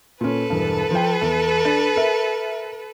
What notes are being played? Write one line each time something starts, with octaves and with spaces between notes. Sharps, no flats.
A#2 C#4 A4 B4
E1 G2
F3 G5
E2
D4 A6
A#4 E5